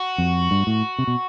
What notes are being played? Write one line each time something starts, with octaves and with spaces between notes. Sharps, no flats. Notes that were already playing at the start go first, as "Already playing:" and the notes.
Already playing: F#4
F2
G2
A2
C3
B2